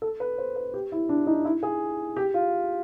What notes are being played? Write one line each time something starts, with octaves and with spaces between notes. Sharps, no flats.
A4
B4
C5
B4
G4
E4
D4
D#4
E4
G#4
G4
F4